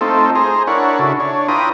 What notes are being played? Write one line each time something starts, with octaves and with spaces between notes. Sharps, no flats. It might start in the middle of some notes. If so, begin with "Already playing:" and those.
A3 C4 D#4 F4 A4
G#4 C5 A#5
D4 E4 A#4 C#5 F#5
C#3 D4 E4 F#4 A4
D4 C#5
E4 F4 B4 G5 A#5 D#6